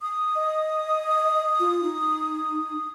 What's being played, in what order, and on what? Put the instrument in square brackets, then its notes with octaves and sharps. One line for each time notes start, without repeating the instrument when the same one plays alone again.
[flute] D#6
[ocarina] D#5
F4
D#4